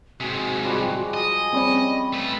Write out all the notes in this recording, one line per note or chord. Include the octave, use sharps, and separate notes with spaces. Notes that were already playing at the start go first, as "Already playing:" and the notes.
G#2 C3 F#4 G#4
F3 G3 G#3
G#4 D#5
G3 C4 C#4 D5 B5 C#6
A3 B4